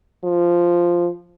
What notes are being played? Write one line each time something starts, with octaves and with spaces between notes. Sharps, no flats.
F3